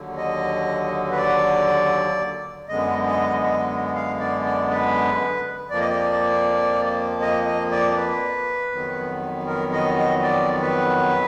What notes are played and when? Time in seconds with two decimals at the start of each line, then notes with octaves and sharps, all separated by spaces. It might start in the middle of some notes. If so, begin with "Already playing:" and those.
Already playing: D#2 D3 F#3
0.17 D#5
1.11 B4
1.18 D5
2.69 F#2 D3 G#3 B3 D#5
3.07 D#5
3.44 D#5
3.95 F5
4.20 D5
4.45 D5
4.70 B4
5.70 F2 F3 A#3 D5
5.80 D#5
5.89 D5
7.22 D#5
7.46 D#5
7.71 D5
7.96 B4
8.72 F2 D#3 F#3 B3
9.47 A#4
9.73 D#5
9.97 D#5
10.23 D5
10.61 B4